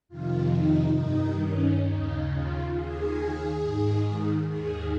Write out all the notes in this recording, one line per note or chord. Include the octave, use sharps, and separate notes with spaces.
F2 C3 D#3 F4
D#4
G2 D#3 D#4
C#4
D#2 C#3 D#4
F4
D#2 D#3 G#4
G#2 D#3
D#2 D#3 G#4